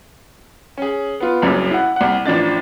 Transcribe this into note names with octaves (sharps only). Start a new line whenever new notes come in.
C#4 G#4
B3 F4
F#1 C2 F#2
E4 F#5
C2 F#5
A1 F3 D4 A6